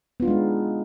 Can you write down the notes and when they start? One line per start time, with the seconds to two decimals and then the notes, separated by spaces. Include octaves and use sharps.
0.20 B3
0.22 F4
0.25 D4
0.28 G#3
0.30 D#4